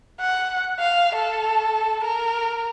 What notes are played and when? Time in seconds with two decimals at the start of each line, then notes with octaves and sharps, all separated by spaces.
0.20 F#5
0.79 F5
1.15 A4
2.04 A#4